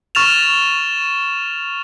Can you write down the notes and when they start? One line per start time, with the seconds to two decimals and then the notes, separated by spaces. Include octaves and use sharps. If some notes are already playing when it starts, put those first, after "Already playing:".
0.15 C#6 F6 A6 E7 F7